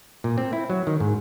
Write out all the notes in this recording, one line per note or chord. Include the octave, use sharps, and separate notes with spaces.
A#2
C4
E4
F#3
D#3
G#2